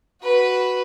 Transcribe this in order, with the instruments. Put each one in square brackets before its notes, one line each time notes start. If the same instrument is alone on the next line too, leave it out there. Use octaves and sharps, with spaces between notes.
[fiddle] F#4 B4